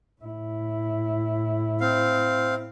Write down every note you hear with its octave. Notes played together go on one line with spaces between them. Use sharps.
A2 E4
C4 F5